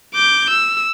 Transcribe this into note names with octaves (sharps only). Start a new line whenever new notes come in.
D6 G6
E6